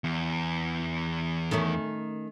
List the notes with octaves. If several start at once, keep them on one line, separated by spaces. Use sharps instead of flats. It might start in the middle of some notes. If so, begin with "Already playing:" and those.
E2
D#3 A3 C#4